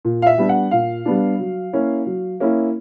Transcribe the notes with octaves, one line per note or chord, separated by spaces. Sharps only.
A#2
F5
E5
G3 B3 D4
F#5
A#2 F5
G3 B3 D4
F#3
A#3 C#4 E4
F#3
A#3 C#4 E4